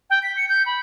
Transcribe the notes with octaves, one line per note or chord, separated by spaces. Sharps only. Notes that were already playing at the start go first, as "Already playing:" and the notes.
G5
B6
C#7
G6
B5